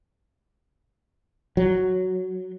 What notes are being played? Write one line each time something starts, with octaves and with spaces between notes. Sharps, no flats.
F#3